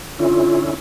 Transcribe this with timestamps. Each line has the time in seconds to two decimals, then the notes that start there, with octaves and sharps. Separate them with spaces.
0.19 D3 C#4 E4 F4